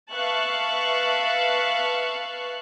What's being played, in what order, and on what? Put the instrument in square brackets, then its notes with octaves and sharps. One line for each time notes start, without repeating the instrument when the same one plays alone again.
[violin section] B4 E5 F5 A5 C#6 F#6